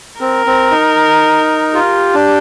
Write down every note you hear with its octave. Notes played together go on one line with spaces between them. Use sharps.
C4 A#4
C4
D#4
F4 G4
D4